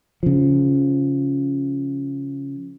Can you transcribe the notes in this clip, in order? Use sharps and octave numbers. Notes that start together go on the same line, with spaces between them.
C#3 F3